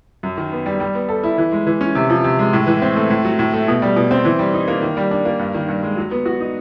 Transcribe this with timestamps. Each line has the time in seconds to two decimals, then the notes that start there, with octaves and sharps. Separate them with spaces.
0.23 F#2
0.38 D#3
0.52 B3
0.66 G3
0.80 G3
0.95 B3
1.09 A4
1.23 E4
1.38 E3
1.52 G#3
1.67 E3
1.81 C#4
1.95 C3
2.09 F3
2.24 C3
2.39 G#3
2.53 A2
2.67 E3
2.82 C4
2.96 A3
3.10 A2
3.25 F#3
3.39 A2
3.53 A3
3.68 B2
3.82 G3
3.96 B2
4.11 C4
4.25 E3
4.39 G3
4.54 D#4
4.68 A#3
4.82 D#3
4.97 G3
5.11 D4
5.25 A#3
5.39 G2
5.54 D#3
5.68 G2
5.83 G#3
5.97 F#3
6.11 B3
6.26 F#4
6.40 D#4